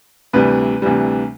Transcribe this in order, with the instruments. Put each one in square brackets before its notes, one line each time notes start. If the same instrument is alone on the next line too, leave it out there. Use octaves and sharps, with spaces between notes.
[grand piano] D2 C3 E3 G3 B4
D2 C3 E3 G3